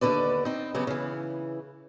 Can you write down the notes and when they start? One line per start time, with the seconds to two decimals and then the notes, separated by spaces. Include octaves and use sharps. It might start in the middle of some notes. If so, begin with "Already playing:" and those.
0.01 D#2 D3 D#3 B4 D5
0.45 C4 D#4
0.74 C#3 F#3 B3 G4
0.87 C#3 E3